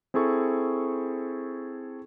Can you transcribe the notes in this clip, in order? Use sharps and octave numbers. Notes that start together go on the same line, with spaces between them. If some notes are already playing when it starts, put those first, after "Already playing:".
C4 E4 G#4 A4 C#6